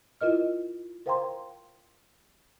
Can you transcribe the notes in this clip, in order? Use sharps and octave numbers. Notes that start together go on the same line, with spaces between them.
E4 F4 A#4 D#5 F6
A#4 C5 F5 G5 A#5 C6